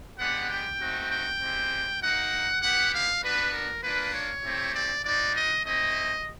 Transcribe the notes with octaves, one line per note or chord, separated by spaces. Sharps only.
G#3 B3 D4 G4 F#5
G5
A3 C4 D#4 F#4
G5
G#3 C4 E4 G4
A#3 D#4 F#4 F#5
B3 E4 G4 F#5
F5
B3 D4 F#4 B4
A#4
A#3 D4 F4 B4
C#5
A3 C4 E4 G4
D5
C4 D#4 F#4 D5
D#5
A3 C4 E4 D#5